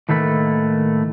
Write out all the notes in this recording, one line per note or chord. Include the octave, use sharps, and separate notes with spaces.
A2 D#3 A3 A#3 A4 B4